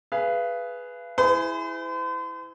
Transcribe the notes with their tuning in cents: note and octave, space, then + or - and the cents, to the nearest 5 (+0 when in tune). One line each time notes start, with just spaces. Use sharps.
G#4 +10 B4 +0 F5 -35
E4 +0 G#4 +0 C5 -45